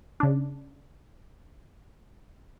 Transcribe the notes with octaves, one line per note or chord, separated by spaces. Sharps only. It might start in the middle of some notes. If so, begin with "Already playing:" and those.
C#3 D4